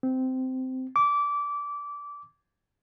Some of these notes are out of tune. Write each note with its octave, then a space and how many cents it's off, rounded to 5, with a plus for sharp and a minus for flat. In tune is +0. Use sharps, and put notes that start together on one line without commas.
C4 -15
D6 -20